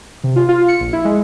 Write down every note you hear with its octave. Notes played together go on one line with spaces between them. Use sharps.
C3
F4
F4
C#7
A#1
E4
G#3